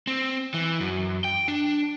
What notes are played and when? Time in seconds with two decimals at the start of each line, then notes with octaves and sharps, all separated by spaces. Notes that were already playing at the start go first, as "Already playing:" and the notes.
0.07 C4
0.54 E3
0.81 F#2
1.24 G5
1.48 D4